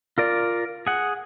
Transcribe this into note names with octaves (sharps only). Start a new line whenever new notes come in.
F4 A#4 D5
G#4 F#5